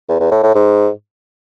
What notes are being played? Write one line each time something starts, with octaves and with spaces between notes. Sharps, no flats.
E2
E2
A2
A2
G#2